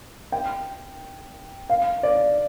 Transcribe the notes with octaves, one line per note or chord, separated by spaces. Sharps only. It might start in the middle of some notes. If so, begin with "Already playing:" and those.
G5
F5
D5